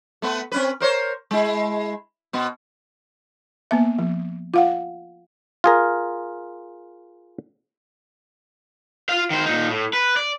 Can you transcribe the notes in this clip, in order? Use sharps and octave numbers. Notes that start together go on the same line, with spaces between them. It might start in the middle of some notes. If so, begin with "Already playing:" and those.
A3 B3 B4
C4 C#4 B4
A#4 C5 C#5
G#3 E4
B2 B3
A#3 B3 E5
F3
F4 F5 F#5
F4 G#4 A#4
F4 F5
D#3 C5
A#2 D#4
A2
B4
D5